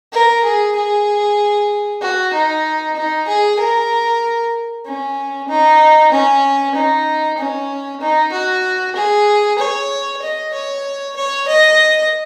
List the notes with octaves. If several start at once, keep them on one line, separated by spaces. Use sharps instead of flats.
A#4
G#4
G#4
F#4
D#4
D#4
G#4
A#4
C#4
D#4
C#4
D#4
C#4
D#4
F#4
G#4
C#5
D#5
C#5
C#5
D#5